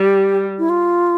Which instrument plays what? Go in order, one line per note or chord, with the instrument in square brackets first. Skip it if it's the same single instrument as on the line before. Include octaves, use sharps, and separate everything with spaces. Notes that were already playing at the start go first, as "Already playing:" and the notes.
Already playing: [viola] G3 [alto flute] G4
[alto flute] E4
F4